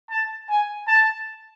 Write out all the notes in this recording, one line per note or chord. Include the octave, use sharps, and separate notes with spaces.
A5
G#5
A5